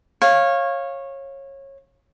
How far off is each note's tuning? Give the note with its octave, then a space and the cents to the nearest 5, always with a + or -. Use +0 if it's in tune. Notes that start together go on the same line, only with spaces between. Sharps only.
C#5 -20 F5 +0